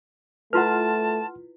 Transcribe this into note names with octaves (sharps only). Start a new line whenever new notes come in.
A3 E4 F4 B4 F#5 A5 C6 F6